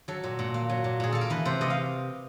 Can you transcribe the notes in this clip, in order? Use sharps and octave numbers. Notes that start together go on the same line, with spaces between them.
F#3 A4
A#2
A#2
A#3
F#3
A#2
A#2 G#4
A#3 A4
A#4
E3 B4
C3 C5
C3 D#5
F5